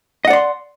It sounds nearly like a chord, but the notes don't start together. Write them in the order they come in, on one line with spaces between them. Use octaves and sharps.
D#5 F#5 D5 C6